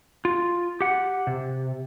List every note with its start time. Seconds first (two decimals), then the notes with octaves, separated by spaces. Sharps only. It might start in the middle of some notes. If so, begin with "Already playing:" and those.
0.25 F4
0.81 G4 F#5
1.27 C3